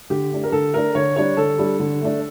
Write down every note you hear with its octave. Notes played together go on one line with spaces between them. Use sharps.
D3 G4
A3 D4
A#4
D3 A4
A3 D4 A#4
D3 C#5
G3 D4 C#5
D3 A4
G3 D4
D3
A3 D4